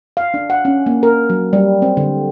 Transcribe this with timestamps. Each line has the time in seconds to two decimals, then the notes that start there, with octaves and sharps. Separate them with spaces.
0.17 F5
0.34 D4
0.50 F#5
0.65 C#4
0.86 A#3
1.03 A#4
1.30 F#3
1.53 G3
1.82 C4
1.97 D3